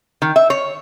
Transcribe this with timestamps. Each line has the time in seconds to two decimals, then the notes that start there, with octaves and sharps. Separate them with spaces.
0.22 D#3
0.36 E5
0.50 C#5